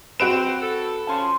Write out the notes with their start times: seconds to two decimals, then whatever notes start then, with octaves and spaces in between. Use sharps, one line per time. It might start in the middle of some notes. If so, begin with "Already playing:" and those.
0.20 C4 F#4 B4 D7 E7
0.61 A4
1.07 F3 C#4 A5 C6